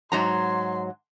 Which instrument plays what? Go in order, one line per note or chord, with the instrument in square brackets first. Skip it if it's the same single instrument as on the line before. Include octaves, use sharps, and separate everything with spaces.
[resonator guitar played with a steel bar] G#2 F#3 A#5 [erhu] C6